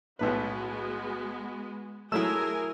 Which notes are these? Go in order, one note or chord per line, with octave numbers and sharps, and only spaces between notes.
B1 A2 G#3 B3 F#4 B4
F#3 A3 E4 G#4 A#4 G#5 E6